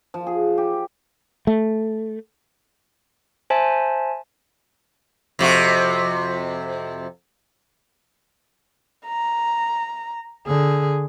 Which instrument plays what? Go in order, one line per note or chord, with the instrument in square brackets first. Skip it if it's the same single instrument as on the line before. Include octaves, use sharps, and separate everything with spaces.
[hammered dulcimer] F3
G#4
G4
[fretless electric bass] A3
[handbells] C5 E5 G#5 A5
[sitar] F2 C3 F#4
[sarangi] A#5
[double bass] D3 [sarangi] G#4